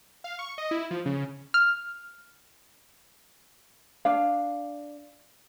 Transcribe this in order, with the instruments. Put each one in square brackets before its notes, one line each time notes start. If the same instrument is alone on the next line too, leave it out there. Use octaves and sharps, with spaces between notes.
[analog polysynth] F5
C#6
D#5
E4
F3
C#3
[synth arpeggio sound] F6
[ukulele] D4 F5